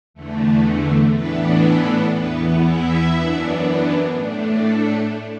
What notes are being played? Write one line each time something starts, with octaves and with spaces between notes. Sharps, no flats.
E2 D3 A3
A2 E3 B3 D4 B4
A4
E2 E3 B3 B4
E4 E5
F#2 E3 B3 D4
A2 A3 D4
A4